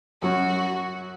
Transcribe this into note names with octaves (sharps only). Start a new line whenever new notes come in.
F#2 F#3 C#4 F#4